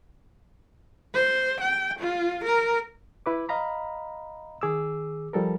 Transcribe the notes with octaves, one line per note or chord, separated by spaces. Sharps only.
C5
G5
F4
A#4
E4 B4 D6
D#5 F5 A#5 B5
D#3 G#4 D6 E6
F3 G3 A4 A#4